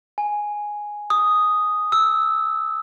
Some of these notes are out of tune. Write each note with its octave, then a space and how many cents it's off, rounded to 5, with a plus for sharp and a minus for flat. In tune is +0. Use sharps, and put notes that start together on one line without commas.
G#5 +0
D#6 +0
E6 -10